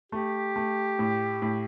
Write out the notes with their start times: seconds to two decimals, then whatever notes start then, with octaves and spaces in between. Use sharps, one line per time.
0.12 A3 G4
0.56 A3
0.99 A2
1.42 A2